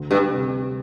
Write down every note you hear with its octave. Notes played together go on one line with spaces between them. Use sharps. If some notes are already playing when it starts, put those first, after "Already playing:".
Already playing: D2
G2 G3
C3